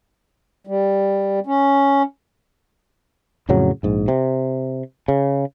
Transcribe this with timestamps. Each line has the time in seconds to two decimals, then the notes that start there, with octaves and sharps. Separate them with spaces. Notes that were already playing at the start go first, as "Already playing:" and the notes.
0.67 G3
1.47 C#4
3.49 F2 A2 C#3 F#3
3.83 A#1 G#2
4.08 C3
5.08 C#3